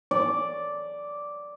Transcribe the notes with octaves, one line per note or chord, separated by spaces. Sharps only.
D5